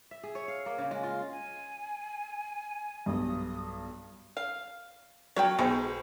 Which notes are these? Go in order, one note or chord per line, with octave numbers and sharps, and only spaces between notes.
E5
G#4
C#5
F5
A#3
C#3
G#3
F4
G#5
B1 G2 D#6
F5
F#3 C#5 F5 G5
B1 G#3 C5